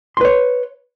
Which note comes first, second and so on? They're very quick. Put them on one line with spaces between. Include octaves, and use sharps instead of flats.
C6 B4 C#5